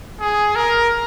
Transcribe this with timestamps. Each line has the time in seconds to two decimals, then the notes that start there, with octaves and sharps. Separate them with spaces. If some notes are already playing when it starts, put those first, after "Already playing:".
0.20 G#4
0.56 A#4